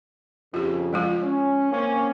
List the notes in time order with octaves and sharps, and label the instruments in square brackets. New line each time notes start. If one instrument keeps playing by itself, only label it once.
[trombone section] F2 C#3 [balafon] F4 G4
[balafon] F3 G#3 F4
[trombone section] C#4
A#3 C4 C#4